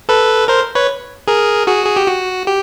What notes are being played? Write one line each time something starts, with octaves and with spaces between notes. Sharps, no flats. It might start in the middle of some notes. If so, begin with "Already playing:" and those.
A4 B4
A#4 C5
B4 C#5
G#4 A#4
F#4 G#4
G#4
G4
F#4
G4